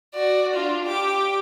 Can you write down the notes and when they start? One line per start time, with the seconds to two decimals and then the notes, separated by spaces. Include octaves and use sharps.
0.14 F#4 D5
0.54 D4 F4
0.85 G4 D6